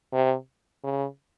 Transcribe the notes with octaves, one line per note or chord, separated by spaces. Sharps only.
C3
C#3